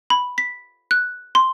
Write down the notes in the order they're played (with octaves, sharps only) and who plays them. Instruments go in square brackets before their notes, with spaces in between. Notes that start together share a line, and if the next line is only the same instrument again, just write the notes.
[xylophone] B5
B6
F#6
C6